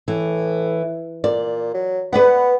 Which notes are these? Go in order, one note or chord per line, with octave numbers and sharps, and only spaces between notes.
A2 E3
A#2 D5
F#3
B3 B4 D5 F#5